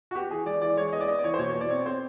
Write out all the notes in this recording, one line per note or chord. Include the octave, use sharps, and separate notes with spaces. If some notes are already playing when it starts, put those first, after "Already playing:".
F#4
B3 G4
E3 G#4
G#3 D5
E3 D5
G#3 C#5
B3 D#5
D5
B3 D#5
D5
E3 C#5
C5
B2 C#5
C#5
B2
D5
C4 C#5
C4 C5